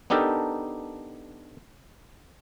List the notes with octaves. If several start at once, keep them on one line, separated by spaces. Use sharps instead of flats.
B3 D4 D#4 G4 A4 A#4